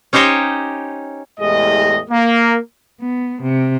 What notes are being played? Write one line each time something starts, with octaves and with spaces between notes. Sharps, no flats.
C#4 D#4 G4 C5 C#5 D#5
E2 A2 G#3 G4 D#5
A#3
B3
C3